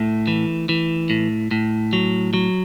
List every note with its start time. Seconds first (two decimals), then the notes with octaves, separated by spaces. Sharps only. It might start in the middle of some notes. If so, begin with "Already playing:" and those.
Already playing: A2 A3
0.27 E3
0.69 E3
1.10 A2
1.51 A2
1.93 F#3
2.34 F#3